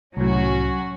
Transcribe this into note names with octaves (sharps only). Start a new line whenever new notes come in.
C2 A2 F#3 C#4 F#4